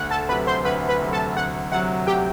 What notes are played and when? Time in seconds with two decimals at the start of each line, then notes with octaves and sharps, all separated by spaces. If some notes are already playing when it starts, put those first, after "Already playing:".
Already playing: D2 F#5
0.11 A4 A5
0.29 C3 F#3 B4 B5
0.47 C5 C6
0.65 D2 B4 B5
0.89 B4 B5
1.01 C3 F#3
1.12 A4 A5
1.36 D2 F#5
1.71 C3 F#3 F#5
2.07 D2 G4 G5